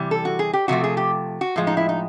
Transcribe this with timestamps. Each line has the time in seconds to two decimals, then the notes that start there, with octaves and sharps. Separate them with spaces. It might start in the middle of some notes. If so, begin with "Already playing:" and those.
Already playing: C3 E3 G3
0.11 A4
0.25 F#4
0.39 G#4
0.53 G4
0.68 C3 F3 A3 F#4
0.84 G#4
0.97 G4
1.41 F#4
1.56 A2 F3 G#3
1.67 D#4
1.77 E4
1.89 D#4